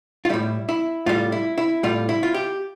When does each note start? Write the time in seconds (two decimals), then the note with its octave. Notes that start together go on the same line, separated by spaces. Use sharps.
0.25 F4
0.29 A2 G3 E4
0.69 E4
1.06 A2 G3 F4
1.32 E4
1.58 E4
1.83 A2 G3 F4
2.09 E4
2.23 F4
2.34 G4